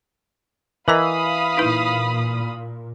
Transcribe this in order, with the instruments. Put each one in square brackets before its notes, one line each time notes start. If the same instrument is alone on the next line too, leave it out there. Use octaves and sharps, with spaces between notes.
[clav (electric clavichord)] E3 [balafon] A#4 D#5 A#5 [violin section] F5 B5 D#6
[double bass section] A#2 [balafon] D#4 E4 B4